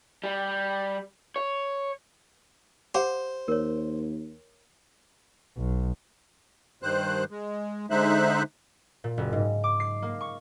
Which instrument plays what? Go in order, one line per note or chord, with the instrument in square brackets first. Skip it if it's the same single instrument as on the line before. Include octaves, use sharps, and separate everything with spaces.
[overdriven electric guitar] G3
C#5
[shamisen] G4 F5 F#5 [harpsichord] C5
[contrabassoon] D#2 [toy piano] A#4 C#5
[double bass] B1
[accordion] G2 D#3 C5 F#6
G#3
D3 G#3 D#4 C5 E5 F#6
[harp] A#2
F#1
G#2
D6
C7
A#3
C#6